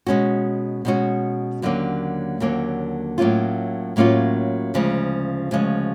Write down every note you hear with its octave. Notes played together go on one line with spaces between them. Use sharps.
B2 G#3 C#4 F#4
B2 G#3 C#4 F#4
D#2 D3 F#3 A#3 C#4
D#2 D3 F#3 A#3 C#4
A2 F#3 A#3 C#4 F4
A2 F#3 A#3 C#4 F4
D2 C#3 F3 G#3
D2 C#3 F3 G#3